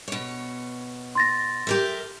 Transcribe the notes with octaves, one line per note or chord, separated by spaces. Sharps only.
B2 C#5
C6 A6 A#6
G4 A#4 E5